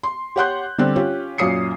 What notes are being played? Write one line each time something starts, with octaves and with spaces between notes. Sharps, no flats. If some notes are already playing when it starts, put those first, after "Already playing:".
C6
G4 C#5 F#5 C6 F#6 G6
D3 G3 C4 F#6
C#4 F4 G4
F#2 A#2 C#4 D#6 C7 C#7